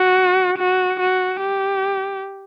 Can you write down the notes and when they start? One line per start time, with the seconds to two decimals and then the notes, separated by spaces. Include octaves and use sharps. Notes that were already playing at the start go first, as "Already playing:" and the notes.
Already playing: F#4
0.58 F#4
1.00 F#4
1.41 G4